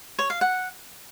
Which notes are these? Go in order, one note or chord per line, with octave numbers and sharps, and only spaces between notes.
C#5
F5
F#5